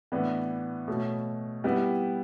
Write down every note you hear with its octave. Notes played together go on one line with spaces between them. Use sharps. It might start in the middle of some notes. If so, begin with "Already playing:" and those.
A2 E3 B3 D4
B2 A3 C#4
G3 B3 E4 G4